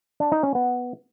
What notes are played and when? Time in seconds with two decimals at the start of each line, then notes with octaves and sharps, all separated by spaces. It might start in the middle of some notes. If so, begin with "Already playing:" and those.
0.20 D4
0.32 D#4
0.43 C#4
0.55 B3